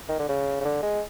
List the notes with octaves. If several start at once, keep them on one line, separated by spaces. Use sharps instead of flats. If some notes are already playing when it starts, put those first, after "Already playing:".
D#3
D3
C#3
C#3
D3
G#3